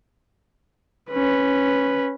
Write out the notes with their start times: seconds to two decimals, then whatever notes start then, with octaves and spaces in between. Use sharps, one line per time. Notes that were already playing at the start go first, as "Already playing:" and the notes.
1.11 C#4 B4